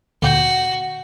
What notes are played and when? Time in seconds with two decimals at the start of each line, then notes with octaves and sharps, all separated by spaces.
0.22 D2 A#2 F#4 G5